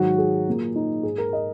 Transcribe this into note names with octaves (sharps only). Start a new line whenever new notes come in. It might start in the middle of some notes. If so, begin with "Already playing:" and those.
Already playing: G#2 D#3 F#3 F#4
G#4
A#2 A#3
D#4
G#2 G#3 G#4
A#4
D#5